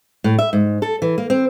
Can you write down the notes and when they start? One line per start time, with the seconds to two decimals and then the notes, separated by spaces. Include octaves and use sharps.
0.24 A2
0.39 E5
0.53 G#2
0.82 A4
1.02 E3
1.18 A#3
1.30 C4